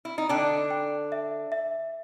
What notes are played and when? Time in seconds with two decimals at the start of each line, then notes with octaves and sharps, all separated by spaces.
0.05 E4
0.18 D#4
0.29 D3 D4 G5
0.71 G5
1.12 E5
1.52 E5